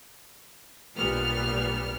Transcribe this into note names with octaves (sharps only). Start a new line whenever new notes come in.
B1 G2 A#2 G3 B3 F6